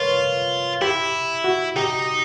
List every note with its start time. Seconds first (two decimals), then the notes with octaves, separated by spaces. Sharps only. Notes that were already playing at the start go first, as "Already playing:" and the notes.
Already playing: F4 A#4 B4 C#5
0.82 E4 G4
1.44 F#4
1.76 D#4 G4